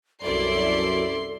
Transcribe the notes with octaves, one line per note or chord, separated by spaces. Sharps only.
C2 F#2 E4 A4 D5 C6